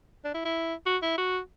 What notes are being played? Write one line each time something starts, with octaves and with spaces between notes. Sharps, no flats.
D4
E4
E4
F#4
E4
F#4